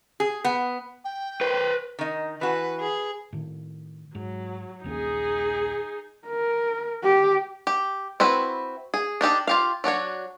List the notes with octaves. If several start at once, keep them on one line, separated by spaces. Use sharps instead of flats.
G#4
B3
G5
B4 C5
D#3 D#4
E3 F#4 B4 A5
G#4
A2 D#3
G#2 F#3
A#1 D#2 C#4 D#4 G#4
A#4
G4
G4
C4 E4 F#4 B4
G#4
D4 D#4 G4 A4
F4 G4 F5
F#3 D4 F#4 C#5